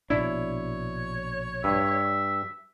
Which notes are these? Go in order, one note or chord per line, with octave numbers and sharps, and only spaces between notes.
A#1 B2 D4 E4 C#5
G2 E5